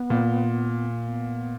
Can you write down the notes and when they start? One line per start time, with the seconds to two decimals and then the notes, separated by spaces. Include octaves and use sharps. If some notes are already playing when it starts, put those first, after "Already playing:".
Already playing: B3
0.10 A#2
1.06 B3